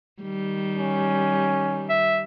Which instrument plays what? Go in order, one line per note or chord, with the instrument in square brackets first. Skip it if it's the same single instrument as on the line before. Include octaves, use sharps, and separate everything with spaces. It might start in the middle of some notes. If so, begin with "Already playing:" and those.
[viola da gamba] D#3 G3
[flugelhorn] C#4
[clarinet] E5